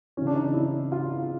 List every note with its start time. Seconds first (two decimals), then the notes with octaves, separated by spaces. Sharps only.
0.17 C#3 E3 C#4
0.27 D4
0.36 D#4
0.54 E4
0.92 F4